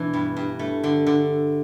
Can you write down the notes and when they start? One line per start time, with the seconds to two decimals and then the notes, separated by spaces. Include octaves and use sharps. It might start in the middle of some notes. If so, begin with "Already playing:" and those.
Already playing: B2 E3 D4
0.13 G2
0.36 G2
0.59 A3
0.83 D3
1.06 D3